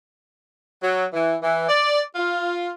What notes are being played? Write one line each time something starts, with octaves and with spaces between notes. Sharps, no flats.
F#3
E3
E3
D5
F4